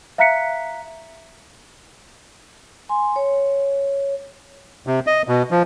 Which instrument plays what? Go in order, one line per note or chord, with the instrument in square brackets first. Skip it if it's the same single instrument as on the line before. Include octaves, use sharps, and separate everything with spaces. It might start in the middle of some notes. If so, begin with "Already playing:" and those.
[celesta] E5 F5 A#5 F#6 B6 C#7
[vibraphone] G#5 C6
C#5
[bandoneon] C3
D#5
B2
F3